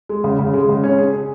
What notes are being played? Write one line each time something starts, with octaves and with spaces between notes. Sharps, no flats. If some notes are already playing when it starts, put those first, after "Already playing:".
G#3
C#3
C#3
G#3
C#3
C#4
G#4
G#4